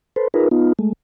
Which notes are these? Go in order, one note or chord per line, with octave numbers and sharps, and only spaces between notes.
A4 B4 C5
D#4 F4 G#4 A#4 B4
B3 D#4 F4
G#3 A3